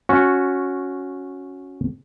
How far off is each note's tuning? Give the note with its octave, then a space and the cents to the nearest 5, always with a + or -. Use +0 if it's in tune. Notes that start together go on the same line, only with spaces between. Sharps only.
C#4 +0 F#4 -10